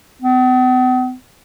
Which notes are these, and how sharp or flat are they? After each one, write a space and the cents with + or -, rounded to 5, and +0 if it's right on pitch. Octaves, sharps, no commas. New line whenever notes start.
B3 +45